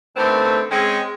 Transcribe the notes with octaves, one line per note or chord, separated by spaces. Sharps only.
D3 D#3 A3 B3 C4
G#3 C4 C#4